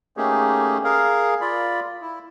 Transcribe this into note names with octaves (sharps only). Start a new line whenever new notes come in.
A3 A#3 C#4 D#4 G4 G#4
G#4 A#4 F5
F4 D5 B5
E4